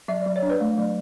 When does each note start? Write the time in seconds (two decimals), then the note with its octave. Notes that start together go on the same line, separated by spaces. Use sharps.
0.08 F#3 E5
0.22 F#3 D5
0.36 C#5
0.43 D4
0.49 B4 D5
0.61 A3
0.78 F#3